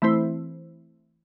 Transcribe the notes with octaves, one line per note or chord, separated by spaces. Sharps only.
E3 A3 C4 E4 C5